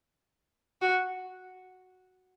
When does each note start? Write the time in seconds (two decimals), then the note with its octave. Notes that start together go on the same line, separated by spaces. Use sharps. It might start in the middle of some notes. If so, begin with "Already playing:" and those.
0.81 F#4